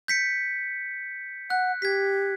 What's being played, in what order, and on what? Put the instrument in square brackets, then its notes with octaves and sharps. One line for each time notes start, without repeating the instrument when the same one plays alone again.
[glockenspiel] G6 B6 C#7
[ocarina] F#5 [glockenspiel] F#6
[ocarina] G4 [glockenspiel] G#6 B6